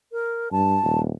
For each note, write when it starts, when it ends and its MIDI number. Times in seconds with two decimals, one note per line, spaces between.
0.12 0.49 70
0.52 0.77 43
0.52 1.00 81
0.83 1.11 27